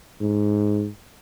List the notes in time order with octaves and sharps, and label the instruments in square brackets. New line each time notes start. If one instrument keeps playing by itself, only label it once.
[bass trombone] G#2